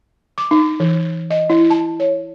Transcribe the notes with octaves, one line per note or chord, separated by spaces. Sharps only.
D6
D#4
E3
D#5
E4
A5
C#5